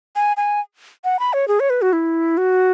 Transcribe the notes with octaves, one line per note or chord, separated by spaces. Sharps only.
G#5
G#5
F#5
B5
C#5
G#4
C#5
B4
F#4
E4
F#4